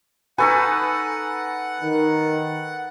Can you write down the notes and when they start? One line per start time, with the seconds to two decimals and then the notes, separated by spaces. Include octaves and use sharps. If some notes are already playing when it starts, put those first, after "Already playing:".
0.38 D#4 A4 B4 F#5 G#5 C#6
1.80 D#3